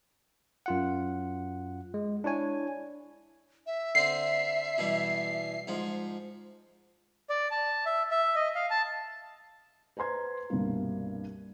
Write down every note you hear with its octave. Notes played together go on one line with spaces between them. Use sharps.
F#2 F4 F#5
G#3
D4 E4 C#5 G#5
E5
D3 C4 C7
B2 E3 G3
G#2 F3
D5
A5
E5
E5
D#5
F5
A5
B4 C5 A#5 C6 G#6
C2 G2 B2 G3 A#3